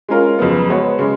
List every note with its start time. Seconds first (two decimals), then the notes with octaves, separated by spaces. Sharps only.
0.08 G#3 C#4 F4 A#4
0.39 F2 C#3 F#3 B3
0.69 G#3 B3 F#4 C#5
0.99 C#3 G#3